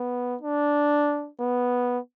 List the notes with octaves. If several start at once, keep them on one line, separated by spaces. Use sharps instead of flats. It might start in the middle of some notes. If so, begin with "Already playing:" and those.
Already playing: B3
D4
B3